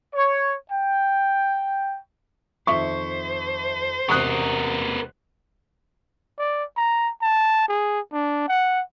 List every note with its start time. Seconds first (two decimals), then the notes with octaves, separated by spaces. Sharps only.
0.15 C#5
0.71 G5
2.67 F2 D#3 C5 E5 C#6
4.09 E1 C3 B3 A#4 C#6 D#6 F#6
6.39 D5
6.77 A#5
7.22 A5
7.68 G#4
8.13 D4
8.48 F#5